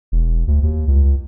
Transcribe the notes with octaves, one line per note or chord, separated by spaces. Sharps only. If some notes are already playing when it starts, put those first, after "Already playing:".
E1
D2
D#2
C#2